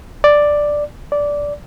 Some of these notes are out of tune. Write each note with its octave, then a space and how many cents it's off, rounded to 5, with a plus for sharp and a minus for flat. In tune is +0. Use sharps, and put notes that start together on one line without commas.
D5 +5
D5 -10